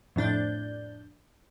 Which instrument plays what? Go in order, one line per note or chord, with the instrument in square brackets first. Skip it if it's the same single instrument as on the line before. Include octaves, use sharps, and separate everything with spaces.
[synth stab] F2 A2 D4 G6